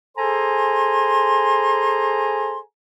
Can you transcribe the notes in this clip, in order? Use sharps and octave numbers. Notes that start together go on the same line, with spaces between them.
G#4 A4 C5 G#5 A#5 C6